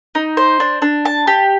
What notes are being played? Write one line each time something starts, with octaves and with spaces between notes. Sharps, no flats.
D#4
C5
D4
D4
A5
G4